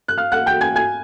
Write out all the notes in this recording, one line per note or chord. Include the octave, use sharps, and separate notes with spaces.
F#6
F5 F6
F#5 F#6
G5 G6
G#5 G#6
G#5 G#6